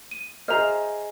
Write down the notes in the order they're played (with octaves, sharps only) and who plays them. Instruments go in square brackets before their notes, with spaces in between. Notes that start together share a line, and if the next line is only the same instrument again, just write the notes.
[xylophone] D#7
[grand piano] G#4 D#5 [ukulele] C5 E5 [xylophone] A#5 F6